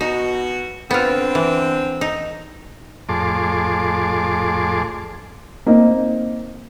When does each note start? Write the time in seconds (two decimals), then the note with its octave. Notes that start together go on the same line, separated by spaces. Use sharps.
0.01 B2 D#4 F#4
0.91 D3 B3 C4 F4
1.35 E3
2.01 D#4
3.09 F2 A2 G#4 A5 C6 D6
5.66 A#3 C4 D#4